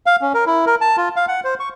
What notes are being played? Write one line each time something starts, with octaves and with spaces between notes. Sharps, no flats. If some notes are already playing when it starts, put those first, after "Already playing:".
F5
C#4
A#4
E4
A#4
A5
F4
F5
F#5
C5
C#6